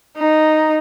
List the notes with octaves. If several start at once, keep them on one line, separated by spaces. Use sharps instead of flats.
D#4